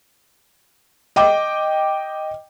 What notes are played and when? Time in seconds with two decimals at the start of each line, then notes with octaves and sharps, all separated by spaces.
1.16 D#5 G5 D6